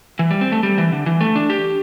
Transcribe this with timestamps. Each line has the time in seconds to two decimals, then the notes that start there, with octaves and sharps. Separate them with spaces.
0.19 E3
0.31 G3
0.41 C4
0.52 A3
0.63 G3
0.78 E3
0.92 D3
1.06 E3
1.21 A3
1.36 D4
1.50 G4